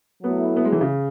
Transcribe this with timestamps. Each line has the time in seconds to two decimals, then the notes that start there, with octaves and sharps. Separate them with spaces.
0.23 F#3 A3 B3 E4
0.56 B3
0.65 G#3
0.72 E3
0.81 C#3